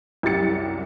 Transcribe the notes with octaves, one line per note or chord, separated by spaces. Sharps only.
C2 F#2 G4 A6 C#7